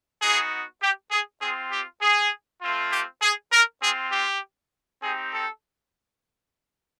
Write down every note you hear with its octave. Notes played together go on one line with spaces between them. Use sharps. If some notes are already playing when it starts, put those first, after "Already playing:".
B3 D#4 F#4 G#4
G4
G#4
C4 F4 G#4
G4
G#4
A3 C4 F4
G4
G#4
A#4
C4 F4 G#4
G4
C4 D#4 G4 G#4
A4